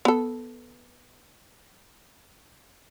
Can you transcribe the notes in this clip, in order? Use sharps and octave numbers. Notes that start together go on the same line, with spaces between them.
B3 A4